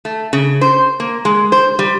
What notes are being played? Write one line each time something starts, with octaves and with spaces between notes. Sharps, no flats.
A3
C#3
C5
A#3
G#3
C5
G3